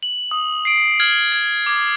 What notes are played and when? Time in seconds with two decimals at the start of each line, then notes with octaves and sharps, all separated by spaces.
0.03 F#7
0.31 D#6
0.65 C7 D7
1.00 F6 G#6 F#7
1.32 G#6
1.66 D6 G#6